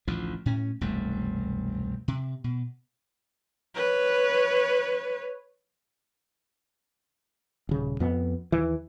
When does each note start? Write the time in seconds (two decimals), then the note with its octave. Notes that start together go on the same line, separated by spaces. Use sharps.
0.08 A1 D2 F3
0.46 A2 C#4
0.81 E1 C2 F#2 A3
2.08 C3
2.44 B2
3.75 B4 C#5
7.69 D#1 C#3
8.00 F2 B3
8.52 D#2 E3